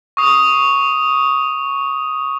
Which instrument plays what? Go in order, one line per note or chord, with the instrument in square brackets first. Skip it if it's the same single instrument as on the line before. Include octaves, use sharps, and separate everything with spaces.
[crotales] C#6 D#6